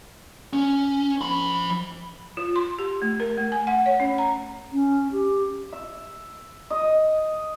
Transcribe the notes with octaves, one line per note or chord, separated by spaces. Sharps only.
C#4
F3 B5
F4
C6
G4
A3
A#4
A3
G#5
F#5
C#5
C#4
A#5
C#4
G4
E5
D#5